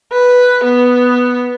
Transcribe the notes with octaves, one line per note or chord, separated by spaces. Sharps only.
B4
B3